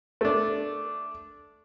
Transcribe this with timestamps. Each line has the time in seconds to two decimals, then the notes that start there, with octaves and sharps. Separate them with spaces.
0.21 A3 D4